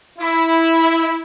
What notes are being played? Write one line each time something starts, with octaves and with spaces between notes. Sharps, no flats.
E4